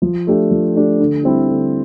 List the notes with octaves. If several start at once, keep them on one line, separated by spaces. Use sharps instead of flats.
F3
A3 D4 G4
F3
A3 D4 G4
D3
G3 C4 E4
D3